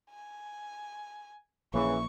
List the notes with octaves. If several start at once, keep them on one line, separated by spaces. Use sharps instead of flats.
G#5
A#1 C#3 E3 A#3 C#6